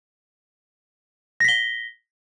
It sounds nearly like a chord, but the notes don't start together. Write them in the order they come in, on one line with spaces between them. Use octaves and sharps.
A#6 B6 G7